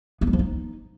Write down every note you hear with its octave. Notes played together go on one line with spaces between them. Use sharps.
B3
F#3
F3
D#4